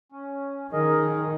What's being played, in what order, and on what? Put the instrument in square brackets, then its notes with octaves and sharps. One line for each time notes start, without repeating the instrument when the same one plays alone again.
[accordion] C#4
[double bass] D#3 [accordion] G#4 A#4 D#5